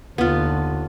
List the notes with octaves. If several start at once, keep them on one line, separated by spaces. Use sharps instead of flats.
D#2 D3 B3 F4